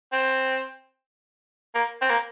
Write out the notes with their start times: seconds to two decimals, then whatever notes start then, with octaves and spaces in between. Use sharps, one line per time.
0.12 C4
1.75 A#3
2.02 C4
2.09 A#3